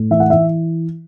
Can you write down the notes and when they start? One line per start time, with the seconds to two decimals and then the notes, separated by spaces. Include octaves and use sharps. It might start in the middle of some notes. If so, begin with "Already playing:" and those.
Already playing: A2
0.10 E3 E5
0.20 F#5
0.30 E3 E5